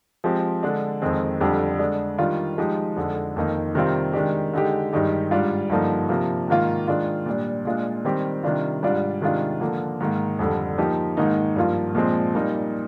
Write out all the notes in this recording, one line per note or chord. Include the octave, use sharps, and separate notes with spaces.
F3 G#3 C4 G4
D3 G#3 D4
F2 D#3 G#3 C4
F2 D3 G3 D4 G4
D3 G#3 D4
D#3 G3 D4 F4
F3 G#3 D#4 G4
F2 D3 G#3
F2 D#3 A#3 D#4
C3 D#3 G3 C4 F4
D#3 G#3 D4 G4
D3 G#3 D#4 G4
G2 D#3 G#3 D#4 G4
G#2 G3 D4 F4
G2 D3 F3 A#3 D#4
C3 F3 A#3
G#2 D#3 A#3 F4
D#3 G#3 D4 F4
A#2 G3 D4
A#2 G#3 D4 F4
D#3 G3 C4 G4
C3 D#3 G3 D4 F4
G#2 G3 D4 F4
C3 D#3 G#3 D4 F4
D3 F3 A#3
G#2 D#3 A#3
F2 D3 G3
F3 A#3 D#4 G4
G#2 D#3 A#3 D#4
G2 F3 A#3 F4
A#2 F3 G#3 C4
A#2 G3 A#3 D#4